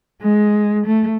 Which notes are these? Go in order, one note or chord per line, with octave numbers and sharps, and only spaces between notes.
G#3
A3